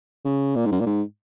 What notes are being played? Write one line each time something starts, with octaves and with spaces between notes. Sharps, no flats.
C#3
A#2
G#2
F#2
A#2
G#2